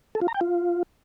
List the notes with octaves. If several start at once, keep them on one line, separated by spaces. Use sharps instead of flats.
A4
F4
A#5
G5
F4